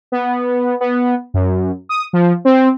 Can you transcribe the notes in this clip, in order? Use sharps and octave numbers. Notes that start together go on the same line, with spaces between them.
B3
B3
F#2
D#6
F3
C4